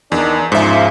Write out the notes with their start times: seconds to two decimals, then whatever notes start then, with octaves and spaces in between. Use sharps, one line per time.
0.12 E2 D#3 D4
0.52 G#2 C#3 F3 E5